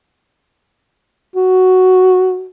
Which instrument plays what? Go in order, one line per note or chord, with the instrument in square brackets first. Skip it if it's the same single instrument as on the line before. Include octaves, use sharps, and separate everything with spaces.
[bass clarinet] F#4